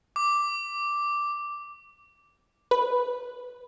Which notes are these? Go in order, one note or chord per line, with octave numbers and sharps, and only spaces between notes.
D6
B4